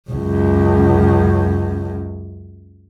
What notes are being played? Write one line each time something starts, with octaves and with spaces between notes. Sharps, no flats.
C#2 F#2